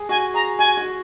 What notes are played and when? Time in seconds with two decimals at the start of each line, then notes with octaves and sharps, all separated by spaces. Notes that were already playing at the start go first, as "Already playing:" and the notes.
Already playing: G#4
0.09 F#4 G#5
0.34 G#4 A#5
0.59 F#4 G#5
0.77 F#4